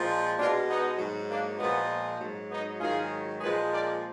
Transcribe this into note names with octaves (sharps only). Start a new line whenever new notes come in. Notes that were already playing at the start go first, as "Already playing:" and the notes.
Already playing: A#2 F3 G#3
B2 G#3 D4 F4
B3 D#4
G#2 F#3
A#3 D4
A#2 F3 G#3 B3
G#2 F#3
B3 D#4
G#2 D#3 F#3 F4 G#4
A#2 F3 G#3 G#4 B4
A#4 D5